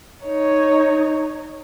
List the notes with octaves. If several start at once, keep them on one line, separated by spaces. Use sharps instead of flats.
D#4 C#5